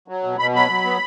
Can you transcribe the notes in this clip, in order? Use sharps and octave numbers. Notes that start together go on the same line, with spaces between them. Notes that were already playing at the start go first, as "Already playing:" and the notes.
F#3
B2
B2 B5
F#3 B5
F#3
B3